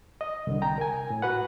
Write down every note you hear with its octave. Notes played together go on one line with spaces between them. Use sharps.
D#5
C2 D3
G5 A#5
A#4 G#5
A2
F#4 B4 F#5